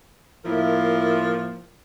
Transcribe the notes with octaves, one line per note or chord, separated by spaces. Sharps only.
A2 F3 A#3 E4 F4 A#4